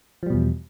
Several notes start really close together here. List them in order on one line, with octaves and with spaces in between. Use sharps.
F3 G3 B2 E2